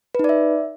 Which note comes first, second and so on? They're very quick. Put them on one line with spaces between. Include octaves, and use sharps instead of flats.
B4 D#4 D5 E5